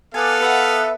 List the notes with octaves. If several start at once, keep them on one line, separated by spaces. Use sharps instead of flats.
B3 A4 D5 F5 G#5
B4 E5 F#5